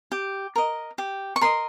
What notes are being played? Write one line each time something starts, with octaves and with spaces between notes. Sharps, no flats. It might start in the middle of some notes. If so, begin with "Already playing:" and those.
G4
A#4 D#5
G4
C#6
A#4 D#5 C6